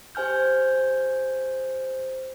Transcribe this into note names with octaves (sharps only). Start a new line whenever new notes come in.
G4 C5 G#5 F6 G6